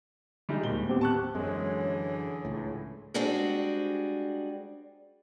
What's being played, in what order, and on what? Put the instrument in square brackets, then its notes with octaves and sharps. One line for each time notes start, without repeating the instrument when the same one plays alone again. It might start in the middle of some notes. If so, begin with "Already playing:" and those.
[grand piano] G3 G#3 D#4
D1 D#2 G7
[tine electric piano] B3 C4 G4
[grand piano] A5 C#6 F#6
[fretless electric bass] F#2 [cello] D3 E3 [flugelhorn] G#3 [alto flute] C#5
[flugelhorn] G#4
[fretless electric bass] C#2 A2
[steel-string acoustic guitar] G3 G#3 C4 D4 F#4 G#4